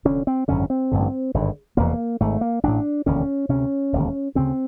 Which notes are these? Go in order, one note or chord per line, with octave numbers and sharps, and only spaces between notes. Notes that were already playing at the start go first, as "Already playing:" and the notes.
F1 F2 D3 C#4
C4
G#1 F#2 D3 C#4
C4
A1 G2 D3
G#1 G2 D3
F1 E2 B2 A#3
G#1 G#2 A3
A#3
A1 A2 D4
E1 D#2 D3 C#4
D2 C3 C#4
E1 D#2 D3
D2 C#3 C4